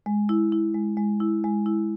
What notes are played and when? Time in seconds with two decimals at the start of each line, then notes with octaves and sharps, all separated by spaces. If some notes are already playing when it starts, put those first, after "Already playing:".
0.06 G#3
0.29 E4
0.52 E4
0.74 G#3
0.97 G#3
1.20 E4
1.44 G#3
1.66 E4